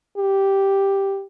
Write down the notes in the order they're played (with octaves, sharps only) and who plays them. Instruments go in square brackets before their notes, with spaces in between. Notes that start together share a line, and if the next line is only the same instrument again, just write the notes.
[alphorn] G4